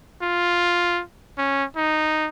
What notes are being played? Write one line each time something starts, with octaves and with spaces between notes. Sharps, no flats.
F4
C#4
D#4